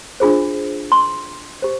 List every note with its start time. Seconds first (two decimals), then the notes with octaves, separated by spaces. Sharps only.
0.20 D4 F4 G#4 C5
0.92 C6
1.62 G4 C5